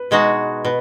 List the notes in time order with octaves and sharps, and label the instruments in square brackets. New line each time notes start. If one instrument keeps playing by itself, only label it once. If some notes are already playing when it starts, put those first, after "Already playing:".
Already playing: [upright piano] B4
[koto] B2 G#3 D#4 F#4
[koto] B2 [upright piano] B4